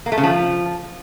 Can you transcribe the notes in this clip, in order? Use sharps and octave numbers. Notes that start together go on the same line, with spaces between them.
A#3
A3
C#3
F3